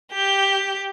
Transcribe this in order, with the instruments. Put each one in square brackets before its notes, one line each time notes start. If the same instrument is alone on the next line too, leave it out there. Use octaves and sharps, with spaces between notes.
[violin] G4 G6